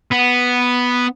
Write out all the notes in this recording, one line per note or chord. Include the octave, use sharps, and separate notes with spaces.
B3